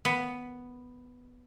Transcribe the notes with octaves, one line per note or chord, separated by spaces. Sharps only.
B3